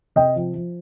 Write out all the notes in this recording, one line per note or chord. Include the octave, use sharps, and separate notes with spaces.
C3 D#5 G5
F3
F3